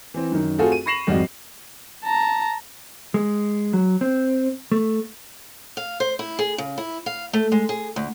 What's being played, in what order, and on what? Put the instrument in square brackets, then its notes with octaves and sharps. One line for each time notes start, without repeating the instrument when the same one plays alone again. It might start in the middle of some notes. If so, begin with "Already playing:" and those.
[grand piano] E3 C4
F#2 D#3
A3 C4 F4 F#4 G#4 A4
D#7
B5 C#6 A#6 C7 E7 F#7
G#1 F2 G3 F#4 D#5
[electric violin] A5 A#5
[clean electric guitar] G#3
F#3
C4
A3
[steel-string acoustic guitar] F5
C5
E4
G#4
C#3
E4
F5
A3
G#3
G#4
D2